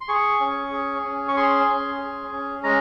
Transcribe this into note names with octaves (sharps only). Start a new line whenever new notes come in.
C6
G#4 C#6
C#4
G#4
C#4
C#6
G#4 C6
C#4
G#4
C#4
G#3 A#5